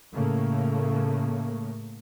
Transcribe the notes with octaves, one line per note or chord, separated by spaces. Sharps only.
A2 C#3 A3 A#3